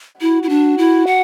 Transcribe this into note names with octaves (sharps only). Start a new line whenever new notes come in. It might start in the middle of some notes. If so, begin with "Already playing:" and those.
E4 F#4
E4
D4
E4
F#5